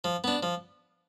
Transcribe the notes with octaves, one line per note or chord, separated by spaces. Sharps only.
F3
B3 D4
F3